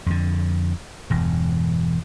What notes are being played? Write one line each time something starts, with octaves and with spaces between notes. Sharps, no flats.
F2 D3
E1 E2 G2